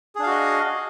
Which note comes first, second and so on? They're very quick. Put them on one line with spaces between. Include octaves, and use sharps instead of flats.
G#4 D4 F5 F#4 D#5